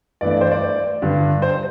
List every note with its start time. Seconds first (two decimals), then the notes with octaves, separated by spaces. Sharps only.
0.21 G2 E3 A3 D5
0.31 D5
0.41 C5
0.52 D5
1.02 G2 D3 G3
1.42 C5